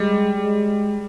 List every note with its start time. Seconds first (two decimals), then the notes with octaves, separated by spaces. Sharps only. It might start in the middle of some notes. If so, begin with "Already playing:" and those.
Already playing: G3 G#3
0.38 G#3